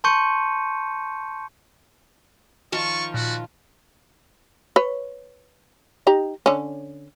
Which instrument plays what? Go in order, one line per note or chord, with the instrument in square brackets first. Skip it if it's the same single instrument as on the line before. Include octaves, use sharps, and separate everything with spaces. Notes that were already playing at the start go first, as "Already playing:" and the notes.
[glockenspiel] A5 C6 C#6 G6 C#7 D#7
[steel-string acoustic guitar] D#3 F3 F4 [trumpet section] D5 C#6
[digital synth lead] A#2 [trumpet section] G3 F#4
[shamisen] B4 C#5
D#4 G4 A#5
D3 C#4